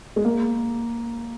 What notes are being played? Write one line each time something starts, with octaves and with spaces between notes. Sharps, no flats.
G#3
A#3